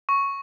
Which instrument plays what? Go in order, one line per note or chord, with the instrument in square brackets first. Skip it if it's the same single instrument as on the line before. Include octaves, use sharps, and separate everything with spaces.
[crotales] C#6